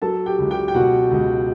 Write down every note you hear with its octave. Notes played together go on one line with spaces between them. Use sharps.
F#3 A4 A5
G4 G5
C#2
G4 G5
G5
B2 F#4 F#5
C#2